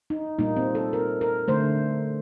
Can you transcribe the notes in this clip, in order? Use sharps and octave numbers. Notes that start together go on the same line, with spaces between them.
D#4
A#2 G3 A#3 D#4
C4
A4
A#4
A#4
D3 A3 C5